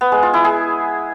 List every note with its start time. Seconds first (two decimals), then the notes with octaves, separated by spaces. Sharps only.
0.01 B3
0.12 G#3
0.23 F4
0.34 E4
0.44 G#4